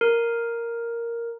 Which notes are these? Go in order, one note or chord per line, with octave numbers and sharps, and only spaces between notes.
A#4